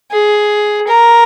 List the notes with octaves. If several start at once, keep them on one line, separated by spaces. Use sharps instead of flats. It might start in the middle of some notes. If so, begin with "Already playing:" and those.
G#4
A#4